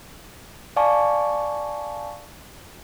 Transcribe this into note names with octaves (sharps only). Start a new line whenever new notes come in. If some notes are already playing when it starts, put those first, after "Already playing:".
D5 F5 G#5 A5 C#6